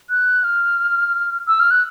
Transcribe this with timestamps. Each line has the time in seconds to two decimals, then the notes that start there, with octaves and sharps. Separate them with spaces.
0.10 F#6
0.44 F6
1.48 E6
1.60 F6
1.71 F#6